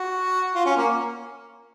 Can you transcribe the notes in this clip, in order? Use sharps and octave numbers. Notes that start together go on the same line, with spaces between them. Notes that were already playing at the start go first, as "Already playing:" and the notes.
Already playing: F#4
F4
C#4
A#3